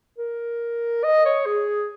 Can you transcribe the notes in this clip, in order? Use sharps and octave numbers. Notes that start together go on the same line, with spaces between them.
A#4
D#5
C#5
G#4